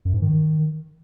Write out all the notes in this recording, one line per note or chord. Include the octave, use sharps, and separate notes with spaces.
F#2
G#2
D#3